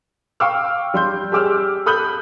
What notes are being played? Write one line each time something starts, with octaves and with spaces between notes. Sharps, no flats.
F5 G5 C#6 D6 E6 F6
G3 C6 G6
G4 G#4 D6 E6 F6
A4 B5 D#6 F#6 G6 F#7